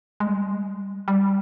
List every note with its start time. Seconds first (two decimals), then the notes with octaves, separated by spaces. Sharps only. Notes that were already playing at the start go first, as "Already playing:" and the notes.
0.20 G#3
0.27 G3
1.08 G3